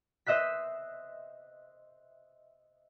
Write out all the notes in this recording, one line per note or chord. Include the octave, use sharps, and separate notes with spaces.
C5 D#5 E5 F#6 B6